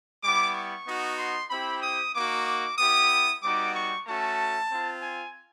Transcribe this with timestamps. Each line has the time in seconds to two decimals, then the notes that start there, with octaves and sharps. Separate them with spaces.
0.22 G3 B3 E4 D6
0.54 C#6
0.86 B3 D#4 F#4
1.19 C6
1.50 C4 E4 G4 B5
1.83 D#6
2.14 A#3 D#4 F#4 D6
2.47 D6
2.78 B3 E4 G4 D#6
3.42 G3 B3 D#4 F#4 D6
3.74 C#6
4.07 A3 C#4 F#4 A5
4.70 C4 F4
5.03 G#5